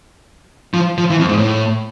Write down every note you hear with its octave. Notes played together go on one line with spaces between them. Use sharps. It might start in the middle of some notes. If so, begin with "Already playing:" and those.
F3
F3
E3
F2
G#2
A2